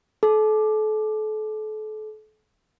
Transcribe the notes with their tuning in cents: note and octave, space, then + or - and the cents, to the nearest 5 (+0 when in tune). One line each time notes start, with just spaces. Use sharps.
A4 -35